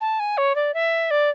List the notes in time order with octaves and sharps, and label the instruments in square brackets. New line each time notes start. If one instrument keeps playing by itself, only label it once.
[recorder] A5
G#5
C#5
D5
E5
D5